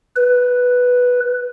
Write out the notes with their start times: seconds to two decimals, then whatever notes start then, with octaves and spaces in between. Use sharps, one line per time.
0.16 B4